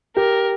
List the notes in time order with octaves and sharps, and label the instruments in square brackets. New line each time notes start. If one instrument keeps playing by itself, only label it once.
[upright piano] G4 [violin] A#4